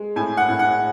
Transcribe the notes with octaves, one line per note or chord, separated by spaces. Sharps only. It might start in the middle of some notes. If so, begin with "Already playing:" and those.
Already playing: G#3
A2 G#5
F#5
A2
F#5